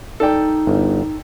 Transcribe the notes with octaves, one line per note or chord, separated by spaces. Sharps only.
D#4 A4 D5 G5
G1